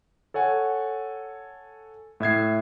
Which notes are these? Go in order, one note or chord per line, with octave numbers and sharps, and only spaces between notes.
A4 C#5 F#5 G#5
A2 E5 G#6 C7